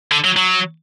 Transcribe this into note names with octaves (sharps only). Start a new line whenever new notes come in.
D3
F#3
F#3